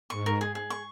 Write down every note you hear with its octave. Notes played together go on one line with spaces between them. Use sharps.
G#2 C#6
A#4
G#4
G#4
C#6